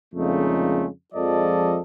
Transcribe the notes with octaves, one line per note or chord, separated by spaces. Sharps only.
F2 A#2 C#3 G#3 A3 D#4
F2 F3 G#3 A4 D5 D#5